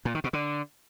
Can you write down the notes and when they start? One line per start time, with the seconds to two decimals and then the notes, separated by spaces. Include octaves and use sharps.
0.05 A#2
0.15 D#3
0.24 B2
0.33 D3